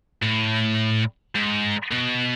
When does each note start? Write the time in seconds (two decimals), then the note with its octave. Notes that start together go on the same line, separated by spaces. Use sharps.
0.22 A2
1.35 G#2
1.92 B2